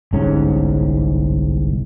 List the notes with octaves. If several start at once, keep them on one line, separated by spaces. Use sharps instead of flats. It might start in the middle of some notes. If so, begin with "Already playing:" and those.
G1 C2 G#2 C#4